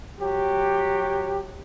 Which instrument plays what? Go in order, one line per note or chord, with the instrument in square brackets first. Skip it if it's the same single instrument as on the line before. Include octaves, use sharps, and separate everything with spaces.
[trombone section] F#3 G4